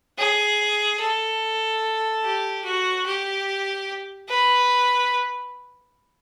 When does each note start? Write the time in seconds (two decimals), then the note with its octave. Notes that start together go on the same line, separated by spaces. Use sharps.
0.18 G#4
1.00 A4
2.24 G4
2.65 F#4
3.06 G4
4.29 B4